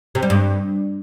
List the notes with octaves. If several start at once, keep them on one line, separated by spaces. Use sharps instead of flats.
C3
G3
G2